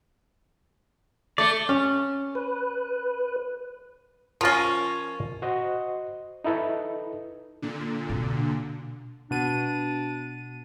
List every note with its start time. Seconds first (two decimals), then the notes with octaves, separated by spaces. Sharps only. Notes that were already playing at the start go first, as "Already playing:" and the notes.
1.38 A3 D5
1.69 C#4
2.35 B4
4.41 F3 C#4 F4 A#4
5.42 F#4 C5 D#5
6.44 D#4 E4 A4 B4
7.62 A#2 D3
8.09 B2 D4
9.31 B2 D4 D#7